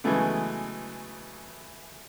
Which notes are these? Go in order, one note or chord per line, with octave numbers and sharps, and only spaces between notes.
C#3 E3 F#3 G#3 A3 B3